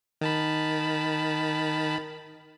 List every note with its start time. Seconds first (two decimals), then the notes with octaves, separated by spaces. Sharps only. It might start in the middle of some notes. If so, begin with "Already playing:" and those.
0.21 D#3 A5 B5